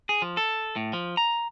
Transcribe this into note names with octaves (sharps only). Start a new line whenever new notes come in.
G#4
F3
A4
A2
F3
A#5